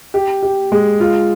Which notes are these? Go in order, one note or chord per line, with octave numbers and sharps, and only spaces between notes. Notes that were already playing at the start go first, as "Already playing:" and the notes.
G4
G4
G#3
F4